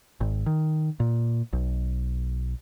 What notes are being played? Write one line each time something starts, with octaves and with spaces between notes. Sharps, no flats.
G#1
D#3
A#2
B1